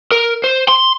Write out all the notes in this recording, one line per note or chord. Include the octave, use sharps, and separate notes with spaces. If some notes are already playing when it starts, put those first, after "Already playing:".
A#4
C5
C6